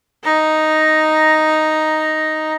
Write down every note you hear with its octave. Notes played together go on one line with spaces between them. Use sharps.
D#4 A#5